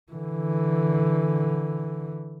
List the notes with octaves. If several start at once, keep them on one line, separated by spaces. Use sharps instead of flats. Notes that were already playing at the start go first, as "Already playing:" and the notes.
D3 E3